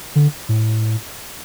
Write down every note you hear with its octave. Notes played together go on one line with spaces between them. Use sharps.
D3
A2